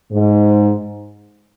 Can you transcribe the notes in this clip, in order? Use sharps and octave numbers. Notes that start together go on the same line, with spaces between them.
G#2